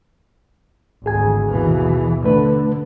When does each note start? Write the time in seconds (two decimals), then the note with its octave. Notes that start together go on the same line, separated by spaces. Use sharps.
1.06 G#1 D2 G#4 G#5
1.47 D#2 B2 E3
2.24 D3 A3 D4 B4